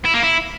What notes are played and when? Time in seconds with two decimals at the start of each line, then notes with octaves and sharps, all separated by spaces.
0.05 E4
0.14 A#3
0.23 E4